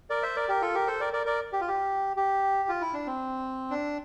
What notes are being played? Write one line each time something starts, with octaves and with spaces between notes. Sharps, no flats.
A#4 D5
C5 E5
A#4 D5
G4 A#4
F4 A4
G4 A#4
A4 C5
A#4 D5
A#4 D5
A#4 D5
G4
F4
G4
G4
F4
E4
D4
C4
D4